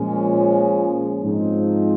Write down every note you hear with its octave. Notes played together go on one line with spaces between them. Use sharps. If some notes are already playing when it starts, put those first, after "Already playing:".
Already playing: A#2 F3 G#3 C#4
G#2 F3 C4 D#4